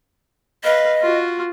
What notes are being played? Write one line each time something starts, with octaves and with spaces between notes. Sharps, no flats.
B4 D#5 F5
F4 F#4